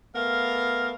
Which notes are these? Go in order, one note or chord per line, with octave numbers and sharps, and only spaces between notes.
A3 B3 A#4 F5